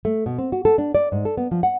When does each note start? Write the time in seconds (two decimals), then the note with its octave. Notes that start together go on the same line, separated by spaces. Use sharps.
0.05 A3
0.26 B2
0.38 C4
0.52 F#4
0.65 A4
0.78 D4
0.95 D5
1.12 G#2
1.25 A4
1.37 B3
1.51 F3
1.63 F#5